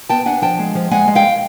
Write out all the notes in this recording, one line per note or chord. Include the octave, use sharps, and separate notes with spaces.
B3 G5 A5
D4 F#5 G#5
F3 G5 A5
G#3
F3
G#3 F#5 G#5
G#3
F5 G5